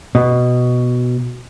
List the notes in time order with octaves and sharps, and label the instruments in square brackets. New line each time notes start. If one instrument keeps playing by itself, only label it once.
[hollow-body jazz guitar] B2